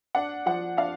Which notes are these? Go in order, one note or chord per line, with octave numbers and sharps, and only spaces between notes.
D4 F#5
F3 F#5
D4 F5